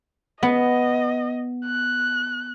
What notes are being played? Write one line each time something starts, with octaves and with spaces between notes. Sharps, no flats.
B3 D#5
F#6